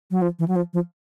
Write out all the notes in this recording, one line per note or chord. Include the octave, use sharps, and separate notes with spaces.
F#3
F3
E3
F#3
F3
F3